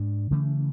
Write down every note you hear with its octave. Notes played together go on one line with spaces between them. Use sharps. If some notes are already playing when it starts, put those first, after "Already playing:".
Already playing: G#2 G#3 D4
C#3 E3 A3 C#4